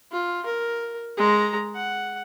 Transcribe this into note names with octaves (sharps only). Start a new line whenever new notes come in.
F4
A#4
G#3 A#5
F#5